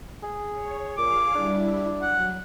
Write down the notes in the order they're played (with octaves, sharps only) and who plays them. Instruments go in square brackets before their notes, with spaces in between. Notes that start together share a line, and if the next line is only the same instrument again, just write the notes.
[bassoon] G#4
[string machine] C#5
[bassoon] A#2 [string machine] G#4 F5 [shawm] D6
[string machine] G3 E4 [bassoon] D4
[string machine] F#3 [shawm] F#5